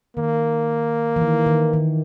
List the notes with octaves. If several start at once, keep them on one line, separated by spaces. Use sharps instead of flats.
D#3 A#3
E3
D#3
D#3
D#3